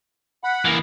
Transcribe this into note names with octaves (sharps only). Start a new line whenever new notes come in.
F#5 B5
E3 A#3